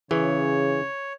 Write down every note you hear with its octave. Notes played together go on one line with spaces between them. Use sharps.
C#3 E3 G#4 C#5